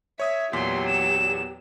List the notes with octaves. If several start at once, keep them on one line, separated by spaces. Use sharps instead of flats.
C#5 E5 D#6 G#6
E2 A#2 F#3 B3 G4 C6 B6
E7